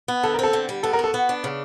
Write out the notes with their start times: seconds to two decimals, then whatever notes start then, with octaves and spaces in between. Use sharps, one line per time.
0.08 B3
0.23 D3 A4
0.34 A#4
0.39 C4 A4
0.53 D3
0.69 G3
0.83 B3 A4
0.93 A#4
0.99 F#4
1.04 A4
1.14 B3
1.29 D4
1.44 C#3